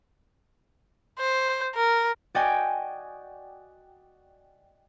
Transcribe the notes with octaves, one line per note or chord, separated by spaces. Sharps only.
C5
A#4
F#4 D5 D#5 G5 G#5